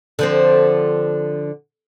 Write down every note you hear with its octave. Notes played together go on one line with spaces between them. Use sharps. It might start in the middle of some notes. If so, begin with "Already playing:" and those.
D3 F3 C4